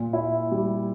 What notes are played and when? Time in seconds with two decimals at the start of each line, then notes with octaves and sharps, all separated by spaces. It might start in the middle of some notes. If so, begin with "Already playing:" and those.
Already playing: A#2
0.13 E4
0.52 G3